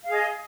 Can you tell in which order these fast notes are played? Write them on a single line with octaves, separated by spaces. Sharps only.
F5 G#4 D#5